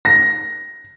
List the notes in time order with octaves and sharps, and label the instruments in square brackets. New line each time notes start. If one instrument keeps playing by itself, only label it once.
[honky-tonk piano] A#6